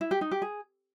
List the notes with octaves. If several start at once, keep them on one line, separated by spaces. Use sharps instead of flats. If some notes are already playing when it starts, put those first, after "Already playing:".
E4
G4
D#4
G4
G#4